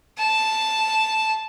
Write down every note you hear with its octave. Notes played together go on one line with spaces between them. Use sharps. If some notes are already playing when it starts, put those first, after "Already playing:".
A5